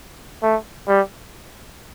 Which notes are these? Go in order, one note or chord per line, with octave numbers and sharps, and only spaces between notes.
A3
G3